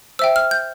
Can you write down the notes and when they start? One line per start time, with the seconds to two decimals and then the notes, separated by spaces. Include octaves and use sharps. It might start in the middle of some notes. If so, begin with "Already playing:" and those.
0.19 C5 E5 G5 E6
0.36 F6
0.51 G6